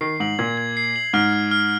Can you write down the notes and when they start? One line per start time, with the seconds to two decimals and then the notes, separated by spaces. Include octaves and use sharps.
0.01 D#3 C7
0.20 G#2 F#7
0.39 A#2 G#6
0.58 G#6
0.77 C7
0.96 F#7
1.14 G#2 F6
1.33 F6
1.51 F6